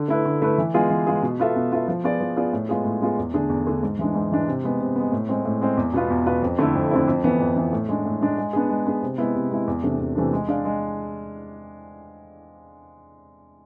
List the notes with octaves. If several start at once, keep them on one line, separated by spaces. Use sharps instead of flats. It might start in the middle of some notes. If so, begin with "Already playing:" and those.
Already playing: D3
A3 E4 B4
D3
A3 E4 B4
E3
G#3 B3 F4 G#4
E3
G#3 B3 F4 G#4
B2
B3 F4 A4 E5
B2
B3 F4 A4 E5
F3
B3 F4 G#4 D5
F3
B3 F4 G#4 D5
A2
G#3 B3 F4 G#4
A2
G#3 B3 F4 G#4
E2
D3 A3 D4 G#4
E2
D3 A3 D4 G#4
G#2
E3 G#3 D4
G#2
E3 G#3 D4
C3
G#3 B3
C3
G#3 B3
A2
G#3 C4
A2
G#3 C4
E2
B2 B3 F4 B4
E2
B2 B3 F4 B4
F2
D3 A3 C4 E4
F2
D3 A3 C4 E4
F2
E3 B3
F2
E3 B3
A2
G#3 D4
A2
G#3 D4
G#3
B3 D4 G#4
G#3
B3 D4 G#4
C3
G#3 B3 E4
C3
G#3 B3 E4
E2
C3 E3 A3 D4
E2
C3 E3 A3 D4
G#3
D4 G#4 D5 F5
G#3